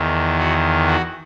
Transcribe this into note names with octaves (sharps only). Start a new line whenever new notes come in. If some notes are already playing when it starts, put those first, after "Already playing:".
Already playing: E2 D#3
F#4
F#4